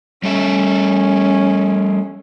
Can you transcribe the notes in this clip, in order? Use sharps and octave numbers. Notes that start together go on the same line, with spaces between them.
G3 A3 C#4 E5